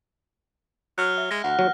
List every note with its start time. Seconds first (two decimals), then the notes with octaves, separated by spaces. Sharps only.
0.98 F#3 F6 F#6 C#7
1.18 E5
1.31 G#3 A#6
1.44 D2 F#5
1.59 D#2 F#3